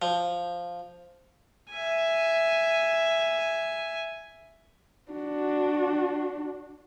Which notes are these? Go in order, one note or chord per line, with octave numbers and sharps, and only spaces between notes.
F3
E5 G#5
D4 F#4